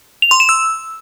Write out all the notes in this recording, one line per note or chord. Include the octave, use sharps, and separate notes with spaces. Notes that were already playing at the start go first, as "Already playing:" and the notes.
F7
C6
E7
E6